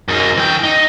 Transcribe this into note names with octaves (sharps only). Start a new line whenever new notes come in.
F#2 D#4
E3 G5
D#4